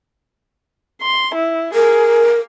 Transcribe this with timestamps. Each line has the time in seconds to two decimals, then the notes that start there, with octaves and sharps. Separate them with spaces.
1.01 C6
1.35 E4
1.74 G#4 A#4